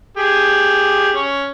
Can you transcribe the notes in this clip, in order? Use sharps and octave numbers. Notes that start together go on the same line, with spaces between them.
G4 G#4
C#4 C#5